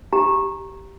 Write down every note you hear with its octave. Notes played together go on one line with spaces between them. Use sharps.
G4 A#5